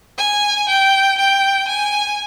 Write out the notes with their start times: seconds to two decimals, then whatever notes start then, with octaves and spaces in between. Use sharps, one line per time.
0.18 G#5
0.69 G5
1.18 G5
1.68 G#5